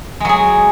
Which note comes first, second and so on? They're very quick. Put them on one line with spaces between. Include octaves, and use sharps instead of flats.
G#3 F#3 G#4